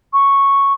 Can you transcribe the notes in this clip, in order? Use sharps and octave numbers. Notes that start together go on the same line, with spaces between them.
C#6